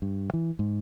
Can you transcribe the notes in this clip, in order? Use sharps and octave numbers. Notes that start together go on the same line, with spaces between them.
G2
E3
G#2